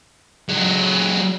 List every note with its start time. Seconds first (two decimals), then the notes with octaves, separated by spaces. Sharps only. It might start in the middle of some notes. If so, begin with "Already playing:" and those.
0.49 F#3 G#3